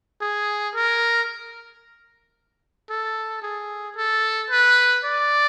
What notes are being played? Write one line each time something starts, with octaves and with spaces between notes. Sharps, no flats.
G#4
A#4
A4
G#4
A4
B4
D5